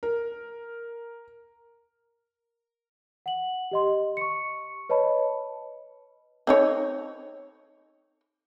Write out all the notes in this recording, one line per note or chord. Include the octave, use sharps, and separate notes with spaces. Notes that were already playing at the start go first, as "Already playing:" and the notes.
A#4
F#5 F#7
G4 D#5 C6
C#6 C#7
B4 C#5 D#5 A5 B5
C4 D#4 C#5